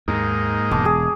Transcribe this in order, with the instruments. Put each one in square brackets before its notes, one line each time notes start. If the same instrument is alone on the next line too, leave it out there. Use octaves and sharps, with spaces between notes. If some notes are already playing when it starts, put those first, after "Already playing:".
[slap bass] D#2 [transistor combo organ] G#2 A#3 D#4
[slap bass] E1 [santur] A5 D6 E6
[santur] G#4